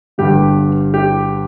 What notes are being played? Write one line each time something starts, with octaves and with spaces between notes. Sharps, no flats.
G1 G2 D3 G4
G4